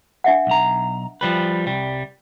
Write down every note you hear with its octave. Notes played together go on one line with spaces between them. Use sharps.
D4 E5 F#5
B1 A#5
F3 G3 B4
C2 G3